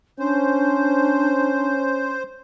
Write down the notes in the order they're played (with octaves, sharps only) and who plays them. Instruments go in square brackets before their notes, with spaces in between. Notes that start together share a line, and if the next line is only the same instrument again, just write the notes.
[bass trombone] C#4 [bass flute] D4 [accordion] C5